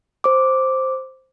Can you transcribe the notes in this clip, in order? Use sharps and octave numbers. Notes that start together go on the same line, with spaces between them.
C5 D6